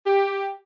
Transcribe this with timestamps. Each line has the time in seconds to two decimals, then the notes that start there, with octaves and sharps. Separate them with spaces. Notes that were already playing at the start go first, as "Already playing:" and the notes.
0.07 G4